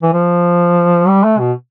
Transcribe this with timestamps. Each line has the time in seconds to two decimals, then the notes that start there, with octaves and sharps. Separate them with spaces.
0.03 E3
0.13 F3
1.08 G3
1.24 A3
1.40 B2